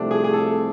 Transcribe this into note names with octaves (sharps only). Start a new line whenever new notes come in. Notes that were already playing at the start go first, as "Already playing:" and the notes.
Already playing: C2 C3 F3 A3 D4
G#4
G#4
A4